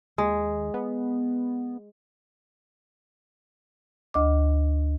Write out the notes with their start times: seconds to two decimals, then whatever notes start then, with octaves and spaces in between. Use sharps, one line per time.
0.18 D#2 G#3
0.74 B3
4.14 D2 D#5 D6